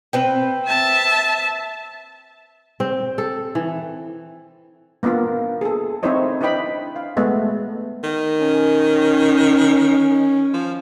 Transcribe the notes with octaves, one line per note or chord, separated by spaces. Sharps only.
C4 B4 G5
E5 A5
C4
A4
E3
A#3 B3 D4 F4 A#4
G#4 A4
C4 D#4 E4 C5 C#5 D#5
D4 E4 B4 D#5 G5 B5
F5
G#3 A3 B3
D#3
C#4
F3